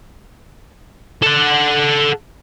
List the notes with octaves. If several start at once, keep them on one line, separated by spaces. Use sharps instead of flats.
A4 F#5